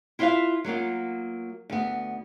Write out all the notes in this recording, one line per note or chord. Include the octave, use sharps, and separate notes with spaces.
E4 F4 B4 C#5 E5 F5
F#3 A#3 B3 F4
D2 B3